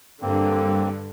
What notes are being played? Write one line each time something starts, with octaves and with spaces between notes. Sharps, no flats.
G2 D3 A#3 C4